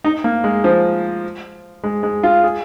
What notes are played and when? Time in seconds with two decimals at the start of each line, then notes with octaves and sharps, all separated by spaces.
0.04 D#4
0.24 A#3
0.44 G#3
0.64 F3
1.84 G#3
2.03 G#3
2.23 F4
2.44 G#4